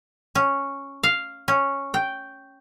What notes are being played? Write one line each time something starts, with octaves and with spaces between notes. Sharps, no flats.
C#4
F5
C#4
G5